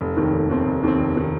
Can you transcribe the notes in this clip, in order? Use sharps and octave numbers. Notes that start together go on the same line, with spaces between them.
F1
D#2 D#3 C4
F1
D#2 D#3 C4
F1
D#2 D#3 C4
F1
D#3 C4